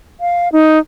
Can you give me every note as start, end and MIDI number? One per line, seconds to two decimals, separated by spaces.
0.20 0.49 77
0.52 0.79 63